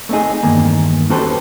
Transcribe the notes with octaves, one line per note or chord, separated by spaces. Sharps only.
A3 C4 D4 D#4 G#4
E2 G2 D#3 A#3
C#4 F#4 G4 A4 B4 C5